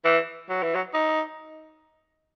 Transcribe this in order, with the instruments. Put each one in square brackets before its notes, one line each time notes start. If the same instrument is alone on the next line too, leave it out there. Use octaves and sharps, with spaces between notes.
[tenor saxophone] E3
F#3
E3
F#3
D#4